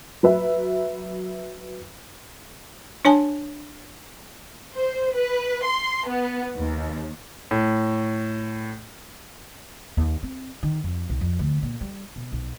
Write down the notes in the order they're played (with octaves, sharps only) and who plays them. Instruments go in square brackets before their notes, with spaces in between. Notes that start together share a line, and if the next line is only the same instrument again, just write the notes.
[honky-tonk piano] F#3 B4 E5
[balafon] D4 C#5 G#5 A5
[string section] C5
B4
C6
B3
D#2
[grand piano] A2
[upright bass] D#2
C4
D#3
F2
C2
F2
D2
A#2
G3
B2
B1